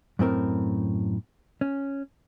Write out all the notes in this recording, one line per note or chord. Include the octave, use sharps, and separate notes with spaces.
F#2 A2 C4 A#4
C#4